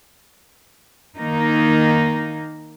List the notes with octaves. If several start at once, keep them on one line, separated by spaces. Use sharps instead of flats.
D#3 A#3 D#4